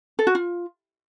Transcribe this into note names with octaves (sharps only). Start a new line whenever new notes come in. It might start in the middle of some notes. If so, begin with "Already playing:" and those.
A4
F#4
F4